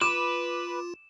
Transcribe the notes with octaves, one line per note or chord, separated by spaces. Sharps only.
F4 B4 D6 E7